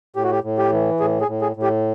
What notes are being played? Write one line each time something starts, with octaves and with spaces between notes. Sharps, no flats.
A2 G4
F#4
G4
A2
G4
E3
A2 G#4
G#4
A2
G#4
A2
G4